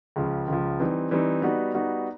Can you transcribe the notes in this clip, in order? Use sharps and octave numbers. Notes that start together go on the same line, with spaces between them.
C#2 C#3 F3
C#2 C#3 F3
E3 G3 C4 D#4
E3 G3 C4 D#4
G3 B3 D#4 F#4
G3 B3 D#4 F#4